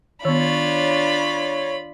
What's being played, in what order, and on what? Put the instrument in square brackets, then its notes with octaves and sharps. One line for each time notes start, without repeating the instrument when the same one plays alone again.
[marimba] D#3 B3 [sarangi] D4 [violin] F4 B5 [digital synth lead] C#5